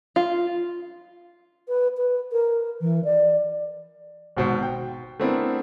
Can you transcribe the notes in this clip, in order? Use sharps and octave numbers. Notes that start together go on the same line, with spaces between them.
F4
B4
B4
A#4
E3
D5
G#1 B2 C5
G5
A3 B3 C4 D4 E4 A#4